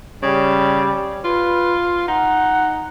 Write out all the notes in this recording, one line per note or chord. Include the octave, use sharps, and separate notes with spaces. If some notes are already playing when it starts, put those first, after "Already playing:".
C#3 G3
F4 B4
D#4 F#5